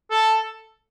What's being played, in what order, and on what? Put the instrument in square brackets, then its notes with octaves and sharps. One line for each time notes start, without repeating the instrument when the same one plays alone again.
[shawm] A4